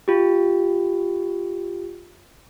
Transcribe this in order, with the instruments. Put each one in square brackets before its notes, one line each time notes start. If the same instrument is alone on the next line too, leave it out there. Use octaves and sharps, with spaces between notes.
[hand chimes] F4 G4